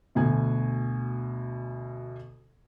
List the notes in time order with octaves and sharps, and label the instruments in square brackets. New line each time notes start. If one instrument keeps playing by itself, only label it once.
[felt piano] D2 B2 G#5